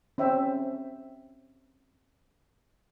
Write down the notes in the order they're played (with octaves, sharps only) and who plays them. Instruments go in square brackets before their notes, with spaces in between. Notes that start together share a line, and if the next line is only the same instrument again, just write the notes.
[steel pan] C4 C#4 E5 G5